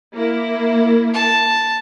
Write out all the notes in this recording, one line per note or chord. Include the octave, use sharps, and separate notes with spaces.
A#3 E4
A5